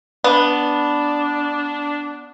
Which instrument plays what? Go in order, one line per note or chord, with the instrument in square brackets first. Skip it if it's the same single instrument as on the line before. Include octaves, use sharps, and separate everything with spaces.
[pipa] B3 [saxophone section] D4